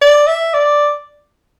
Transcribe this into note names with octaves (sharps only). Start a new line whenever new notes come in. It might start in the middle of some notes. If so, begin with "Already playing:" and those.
D5
E5
D5